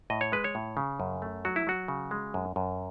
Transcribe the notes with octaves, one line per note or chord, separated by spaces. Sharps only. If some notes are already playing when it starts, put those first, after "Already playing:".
A2 D#5
C#5
G#3 B4
C#5
A2
C#3
F#2
A3
F#3 F#4
E4
F#3 F#4
C#3
G#3
F#2
F#2